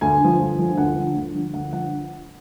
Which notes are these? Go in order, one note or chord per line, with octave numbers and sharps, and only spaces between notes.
D2 G#5
D3 F3
D2
D3 F3
D2 F#5
D3 F3
D2
D3 F3
D2 F#5
D3 F3 F#5